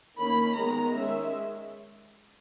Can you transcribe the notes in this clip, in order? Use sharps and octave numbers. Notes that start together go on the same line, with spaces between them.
D#3 A#3 C#4 B5
D#3 G#3 B3 A#5
D#3 G#3 C#4 E5